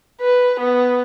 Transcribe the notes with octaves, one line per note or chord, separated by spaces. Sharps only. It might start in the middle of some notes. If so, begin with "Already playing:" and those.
B4
B3